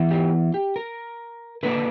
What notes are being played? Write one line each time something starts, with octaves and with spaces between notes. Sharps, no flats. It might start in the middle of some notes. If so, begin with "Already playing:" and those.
Already playing: E3 B3 E4
G4
G4
A#4
D3 A#3 D4 B4